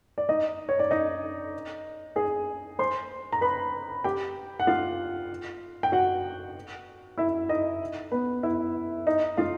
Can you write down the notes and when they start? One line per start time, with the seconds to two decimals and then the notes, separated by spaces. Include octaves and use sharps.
0.18 D5
0.29 D#4 D#5
0.69 C#5
0.79 D5
0.91 D#4 D#5
2.16 G#4 G#5
2.79 C5 C6
3.32 A#5
3.41 B4 B5
4.04 G4 G5
4.60 F#5
4.67 F4 F5
5.83 G5
5.92 F#4 F#5
7.18 E4 E5
7.49 D#4 D#5
8.12 B3 B4
8.43 E4 E5
9.07 D#4 D#5
9.37 F4 F5